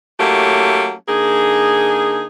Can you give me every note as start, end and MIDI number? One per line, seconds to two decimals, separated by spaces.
0.20 0.94 54
0.20 0.94 57
0.20 0.94 58
0.20 0.94 61
0.20 0.94 64
0.20 0.94 67
1.08 2.26 50
1.08 2.26 58
1.08 2.26 63
1.08 2.26 68